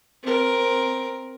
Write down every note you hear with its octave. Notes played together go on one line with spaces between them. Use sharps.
C4 A#4